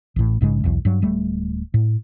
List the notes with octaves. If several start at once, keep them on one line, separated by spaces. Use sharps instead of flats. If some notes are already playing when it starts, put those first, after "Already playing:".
A1 A2
A#1 G#2 C#3 G#3
B1 E2
G2 F#3
D1 G3 A3
A2